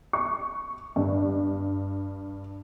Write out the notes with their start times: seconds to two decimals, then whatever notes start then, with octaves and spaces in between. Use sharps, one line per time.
0.13 C#6
0.96 G2